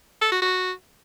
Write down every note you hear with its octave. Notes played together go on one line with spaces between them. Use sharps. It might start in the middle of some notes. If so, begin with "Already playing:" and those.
A4
F#4
F#4